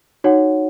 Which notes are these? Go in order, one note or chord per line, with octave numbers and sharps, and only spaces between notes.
D#4 F#4 C#5 F#5